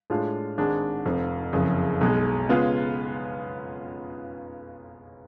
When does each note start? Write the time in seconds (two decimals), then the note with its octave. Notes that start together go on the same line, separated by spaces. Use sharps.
0.10 A2 G#3 D4 F4
0.58 G#1 G#2 G#3 D4
1.05 F1 F2 F3
1.53 F#1 F2 C#3
2.01 B1 B2 G#3
2.49 C#3 G#3 B3 F4